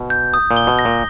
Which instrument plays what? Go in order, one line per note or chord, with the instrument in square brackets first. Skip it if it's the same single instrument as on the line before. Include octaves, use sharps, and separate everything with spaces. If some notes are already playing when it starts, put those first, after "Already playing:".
Already playing: [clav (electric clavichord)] B2
[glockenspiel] G6
D#6
[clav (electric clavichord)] A#2
[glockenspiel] G7
[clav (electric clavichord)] B2
[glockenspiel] A#6
[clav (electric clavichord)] A#2